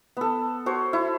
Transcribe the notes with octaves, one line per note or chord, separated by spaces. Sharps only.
B3 A4
F#4 C5 C#5
E4